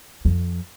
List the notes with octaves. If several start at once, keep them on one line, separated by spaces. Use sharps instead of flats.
F2